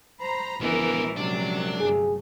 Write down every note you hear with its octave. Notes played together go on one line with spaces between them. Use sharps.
C5 A#5 B5
A#1 F#2 D3 E3 G#3 B3 A#4
C3 F#3 D4
G1 A3 G#4